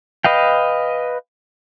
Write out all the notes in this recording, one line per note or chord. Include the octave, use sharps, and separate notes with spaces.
B4 D#5 F5 G5